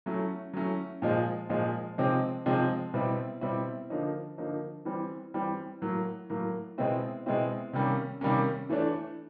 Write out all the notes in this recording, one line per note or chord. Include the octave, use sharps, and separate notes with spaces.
F#3 A3 C#4 E4
F#3 A3 C#4 E4
A#2 F3 G#3
A#2 F3 G#3
C3 F3 G#3 C4 D#4
C3 F3 G#3 C4 D#4
B2 G3 C4 E4
B2 G3 C4 E4
D3 F3 A#3 D#4
D3 F3 A#3 D#4
E3 G3 C4
E3 G3 C4
A2 F#3 A#3
A2 F#3 A#3
B2 G#3 C4 E4
B2 G#3 C4 E4
C3 D#3 G3 A#3 C#4
C3 D#3 G3 A#3 C#4
E3 A3 D4